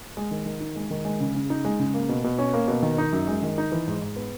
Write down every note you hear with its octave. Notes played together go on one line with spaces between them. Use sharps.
G#3
D#3
D#3
D#4
G#3
D#3
G#3
C#3
C#3
D#4
G#3
C#3
A#3
B2
B2
C#4
A#3
B2
D#3
D#4
F#2
G#3
D#3
D#4
E3
G#2
G#2
B3